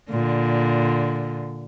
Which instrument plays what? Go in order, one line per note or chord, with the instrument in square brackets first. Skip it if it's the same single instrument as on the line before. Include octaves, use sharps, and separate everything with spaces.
[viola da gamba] A#2 D3